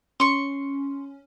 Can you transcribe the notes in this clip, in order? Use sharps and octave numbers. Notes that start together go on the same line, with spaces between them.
C#4 C6 C#6